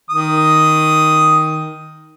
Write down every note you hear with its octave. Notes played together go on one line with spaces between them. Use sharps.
D#3 D#6